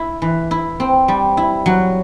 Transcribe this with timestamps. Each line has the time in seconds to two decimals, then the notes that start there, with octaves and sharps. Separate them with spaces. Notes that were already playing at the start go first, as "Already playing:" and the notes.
Already playing: E4
0.22 E3
0.51 E4
0.80 C4
1.08 G3
1.37 E4
1.66 F#3